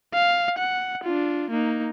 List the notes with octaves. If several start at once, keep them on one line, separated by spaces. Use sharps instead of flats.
F5
F#5
D4 F4
A#3 D#4